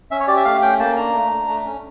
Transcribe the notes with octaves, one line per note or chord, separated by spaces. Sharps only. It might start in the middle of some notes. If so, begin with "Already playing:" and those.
C#4 E5
C#5
G4 D5
E5
A3 F5
C#4 G5
A#3 A5
D4 A#5
A3
D4
A3
C#4